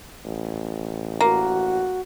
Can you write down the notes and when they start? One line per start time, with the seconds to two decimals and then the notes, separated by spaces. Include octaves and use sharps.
0.25 A1
1.20 A#3 F#4